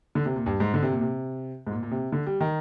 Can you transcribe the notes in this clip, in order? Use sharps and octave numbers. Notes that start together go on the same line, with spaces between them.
D3
C3
A#2
G2
G#2
D3
C3
A#2
C3
G#2
A#2
A#2
C3
D3
G3
D#3